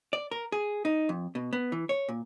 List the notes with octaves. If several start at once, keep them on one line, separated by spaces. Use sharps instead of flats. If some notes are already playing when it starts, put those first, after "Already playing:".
D5
A#4
G#4
D#4
F2
B2
B3
E3
C#5
A#2